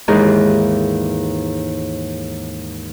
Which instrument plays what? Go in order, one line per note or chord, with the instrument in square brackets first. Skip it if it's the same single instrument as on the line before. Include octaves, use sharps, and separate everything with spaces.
[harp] D#2 G#2 E3 G#4 A#4